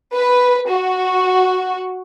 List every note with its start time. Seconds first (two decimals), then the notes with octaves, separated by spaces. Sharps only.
0.13 B4
0.69 F#4